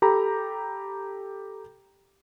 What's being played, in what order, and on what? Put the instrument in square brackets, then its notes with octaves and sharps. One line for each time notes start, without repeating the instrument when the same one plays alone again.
[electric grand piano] G4 A4 A#5 B5